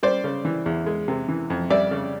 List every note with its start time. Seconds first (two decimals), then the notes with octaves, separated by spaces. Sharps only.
0.03 G3 C5 D5
0.24 C#3
0.45 E3
0.66 E2
0.86 G#3
1.08 C3
1.28 E3
1.50 F2
1.70 G3 D5 E5
1.91 C#3